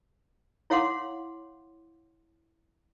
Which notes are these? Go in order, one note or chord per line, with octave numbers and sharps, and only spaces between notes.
E4 C#5 F5 F#5 C6 D6